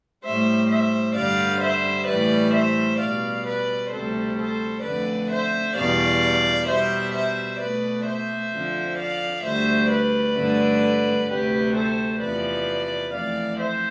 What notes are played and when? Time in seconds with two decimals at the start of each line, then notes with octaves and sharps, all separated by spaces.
0.25 A2 G3 C5 E5
0.70 C5 E5
1.16 G2 D3 G3 D5 F5
1.62 C5 E5
2.08 A2 E3 G3 B4 D5
2.54 C5 E5
3.00 B2 G3 D5 F5
3.47 B4 D5
3.92 D2 C3 G3 A4 C5
4.39 A4 C5
4.84 F2 D3 A3 B4 D5
5.31 C5 E5
5.76 E2 B2 G3 D5 F5
6.68 B2 G3 C5 E5
7.14 C5 E5
7.61 B2 A3 B4 D5
8.06 C5 E5
8.53 F2 D3 F3
8.99 D5 F5
9.45 D2 D3 G3 C5 E5
9.91 B4 D5
10.37 G2 D3 A3
11.29 D2 C3 G3 G4 B4
11.75 A4 C5
12.21 E2 C3 F3 B4 D5
13.13 F2 E3 A3 D5 F5
13.59 C5 E5